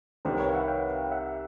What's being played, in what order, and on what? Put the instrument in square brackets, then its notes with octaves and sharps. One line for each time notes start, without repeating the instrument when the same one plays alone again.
[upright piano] C2 C3 D#3 [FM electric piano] A#4 C5
[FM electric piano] B4 C#5
F5
E5 F#5
F5 G5
E5 F#5
E5 F#5